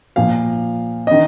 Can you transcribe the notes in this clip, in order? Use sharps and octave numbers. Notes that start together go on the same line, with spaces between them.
A#2 F3 F5
D#3 D#5